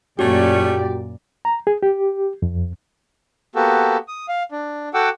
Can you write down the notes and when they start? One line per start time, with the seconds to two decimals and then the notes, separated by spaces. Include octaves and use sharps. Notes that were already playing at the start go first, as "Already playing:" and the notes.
0.19 F#2 A#2 A3 C#4 F#4 G4 D5
1.45 A#5
1.67 G#4
1.83 G4
2.42 F2
3.56 A#3 B3 F#4 G4 A4
4.08 D#6
4.29 F5
4.52 D4
4.94 F#4 A4 F#5 G5 D6 E6